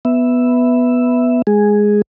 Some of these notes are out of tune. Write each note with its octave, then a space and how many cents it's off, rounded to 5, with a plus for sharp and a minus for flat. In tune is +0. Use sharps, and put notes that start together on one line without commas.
B3 +0 E5 +0
G#3 +0 G#4 +0